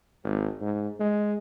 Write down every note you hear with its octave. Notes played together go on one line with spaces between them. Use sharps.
G#1
G#2
G#3